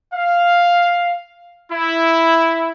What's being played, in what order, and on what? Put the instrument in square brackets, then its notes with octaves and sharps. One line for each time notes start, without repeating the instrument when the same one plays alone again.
[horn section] F5
E4